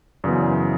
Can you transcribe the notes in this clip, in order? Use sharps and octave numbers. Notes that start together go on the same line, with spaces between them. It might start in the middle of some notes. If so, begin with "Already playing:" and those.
F#2 C#3 E3 B3 D5